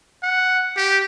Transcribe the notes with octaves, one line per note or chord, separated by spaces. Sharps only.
F#5
G4